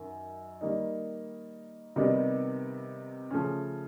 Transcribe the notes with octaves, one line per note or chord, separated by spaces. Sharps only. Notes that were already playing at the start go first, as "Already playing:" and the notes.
Already playing: F#2 D#3
D#3 G3 A#3 D#4
C3 D#3 G3 B3 D#4
C#3 F3 A3 C#4